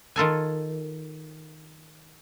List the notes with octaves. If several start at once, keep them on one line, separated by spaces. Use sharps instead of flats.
D#3 F4 A4 G#5